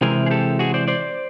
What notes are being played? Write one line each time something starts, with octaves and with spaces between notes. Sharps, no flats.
C3 E3 G#3 C4 G#4 A#4
G#4
G4 A4
F#4 G#4
C5 D5
C5 D5